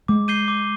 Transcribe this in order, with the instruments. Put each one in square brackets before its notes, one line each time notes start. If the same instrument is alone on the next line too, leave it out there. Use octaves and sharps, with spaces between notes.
[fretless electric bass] G#3 [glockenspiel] D6
[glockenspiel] G6 C7 D#7 G7
D6